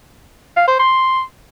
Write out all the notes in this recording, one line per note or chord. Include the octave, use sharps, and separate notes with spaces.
F5
C5
C6